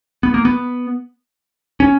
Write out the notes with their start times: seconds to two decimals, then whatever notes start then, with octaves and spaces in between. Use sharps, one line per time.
0.23 B3
0.34 A#3
0.45 B3
1.80 C#4